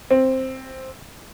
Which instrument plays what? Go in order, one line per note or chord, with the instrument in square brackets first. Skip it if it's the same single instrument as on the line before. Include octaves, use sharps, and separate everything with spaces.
[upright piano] C4